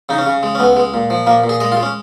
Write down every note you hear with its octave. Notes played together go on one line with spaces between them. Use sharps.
C#3 D#4
C#4
C#3
G#3
C#4
C#2 B3
G#3
A#2
F3
A#2 A#3
A#2
G#4
G#3 D#5
F4
G#3
C#4